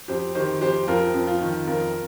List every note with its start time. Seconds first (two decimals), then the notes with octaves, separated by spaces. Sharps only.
0.08 F2 G4 C5
0.35 D#3 G4 C5
0.61 F2 G4 C5
0.88 F2 F4 A#4
1.14 F2
1.27 F4
1.41 D#3
1.67 F2 F4 A#4